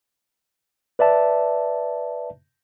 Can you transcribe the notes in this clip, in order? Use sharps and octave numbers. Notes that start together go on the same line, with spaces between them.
B4 D5 E5 A5